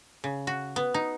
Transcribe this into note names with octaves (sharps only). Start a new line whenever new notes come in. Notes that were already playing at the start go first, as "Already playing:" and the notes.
C#3
F#4
B3
D#4